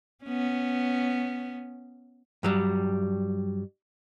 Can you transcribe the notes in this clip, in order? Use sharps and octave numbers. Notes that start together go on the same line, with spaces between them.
B3 C#4
G2 F#3 G3